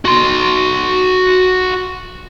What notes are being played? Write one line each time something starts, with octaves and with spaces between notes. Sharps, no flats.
F#4 C6